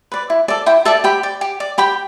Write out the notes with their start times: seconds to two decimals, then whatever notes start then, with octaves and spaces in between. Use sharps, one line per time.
0.12 B4 D5
0.30 E4
0.48 A4 D5
0.66 E4 G5
0.85 A4 D5 E5 A5
1.04 G4 G5 B5
1.23 D5
1.41 G4
1.60 D5
1.78 G4 G5 B5